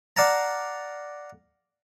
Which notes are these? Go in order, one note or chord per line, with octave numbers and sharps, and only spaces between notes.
D5 F5 F#5 A5 A#5